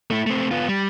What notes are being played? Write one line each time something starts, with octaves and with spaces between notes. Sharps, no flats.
A3 E4
A3 C4
B3 F4
G3